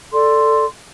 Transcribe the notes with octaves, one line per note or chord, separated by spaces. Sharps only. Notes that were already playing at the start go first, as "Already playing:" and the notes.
A4 D5 C6